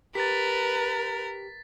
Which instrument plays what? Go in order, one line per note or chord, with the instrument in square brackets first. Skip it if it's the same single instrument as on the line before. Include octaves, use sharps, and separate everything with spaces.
[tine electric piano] G4 [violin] A#4 [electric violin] B4 [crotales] A6 B6